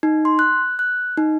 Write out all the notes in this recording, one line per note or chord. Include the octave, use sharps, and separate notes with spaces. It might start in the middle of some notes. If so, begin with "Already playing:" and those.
D#4
C6
F#6
F#6
D#4